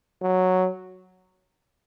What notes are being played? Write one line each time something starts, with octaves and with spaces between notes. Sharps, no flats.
F#3